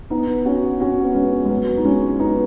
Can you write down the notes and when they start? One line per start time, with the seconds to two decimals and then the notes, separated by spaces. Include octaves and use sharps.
0.10 B3 D#4
0.45 C#4 F#4
0.80 C#4 F#4
1.04 B3
1.15 G#3 C#4
1.45 G#3
1.50 F#3 B3
1.78 D#4
1.85 G#3 C#4
2.19 B3 D#4